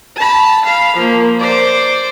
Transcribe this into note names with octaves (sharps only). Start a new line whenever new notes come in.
A5 B5
F5 B5
F3 A#3
C5 D5